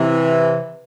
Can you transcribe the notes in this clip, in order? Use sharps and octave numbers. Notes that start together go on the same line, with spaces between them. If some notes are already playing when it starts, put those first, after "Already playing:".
Already playing: C3 E3